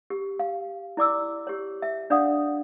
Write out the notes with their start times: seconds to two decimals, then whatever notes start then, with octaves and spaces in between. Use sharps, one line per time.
0.10 G4
0.39 F5
0.97 E4 D5 D6 E6
1.47 G4 C#5
1.82 E5
2.10 D4 D5 F5 F#5 D#6